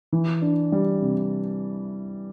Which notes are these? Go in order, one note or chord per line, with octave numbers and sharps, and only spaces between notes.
E3
D4
G3
C3